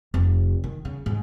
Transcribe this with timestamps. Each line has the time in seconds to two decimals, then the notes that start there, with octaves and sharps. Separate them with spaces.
0.14 F1
0.64 D#3
0.85 C#3
1.06 G#2